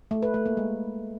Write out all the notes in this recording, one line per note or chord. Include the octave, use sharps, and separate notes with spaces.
A3
B4
A3
A#3
G#3